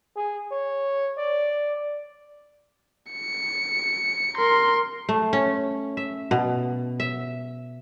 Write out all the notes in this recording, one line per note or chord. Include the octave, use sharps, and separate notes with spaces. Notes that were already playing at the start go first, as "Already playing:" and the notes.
G#4
C#5
D5
C#7
A#4 C6
A3
C#4
E5
B2
E5